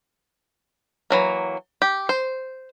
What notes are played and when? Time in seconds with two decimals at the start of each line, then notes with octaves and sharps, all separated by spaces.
1.10 E3 F#3 A#3
1.82 G4
2.09 C5